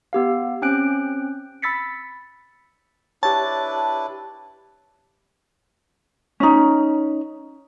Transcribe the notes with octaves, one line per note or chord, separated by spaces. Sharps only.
B3 G4 F5
C4 C#4 G5 F#6 D7
B5 E6 A6 B6 C#7
D4 E4 G4 B4 C#5 A5
C#4 D#4